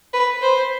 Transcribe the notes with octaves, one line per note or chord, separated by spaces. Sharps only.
B4
C5